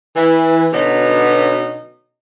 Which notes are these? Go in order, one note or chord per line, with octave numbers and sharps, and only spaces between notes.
E3
B2 D3 F#3 B3 C#4 D#4